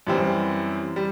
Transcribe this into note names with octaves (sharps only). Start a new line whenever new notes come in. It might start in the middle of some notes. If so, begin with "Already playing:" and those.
F#2 E3 G3 C4
G3